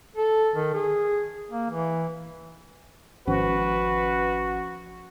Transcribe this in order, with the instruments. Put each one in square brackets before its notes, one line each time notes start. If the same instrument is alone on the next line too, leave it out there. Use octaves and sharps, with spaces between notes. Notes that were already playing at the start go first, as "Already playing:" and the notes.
[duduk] A4
D#3
G#4
A#3
E3
[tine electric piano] G#1 [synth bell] F3 C#4 [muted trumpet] F#4 [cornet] B4